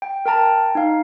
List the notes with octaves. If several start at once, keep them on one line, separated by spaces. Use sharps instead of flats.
G5
A#4 G5 A5 A#5
D#4 F5